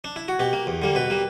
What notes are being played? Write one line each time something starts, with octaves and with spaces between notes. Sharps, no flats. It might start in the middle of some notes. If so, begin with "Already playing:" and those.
D4
E4
F#4
B2 G4
A#3
E2
D3 G3 A#3
B2 B4
G3 A#3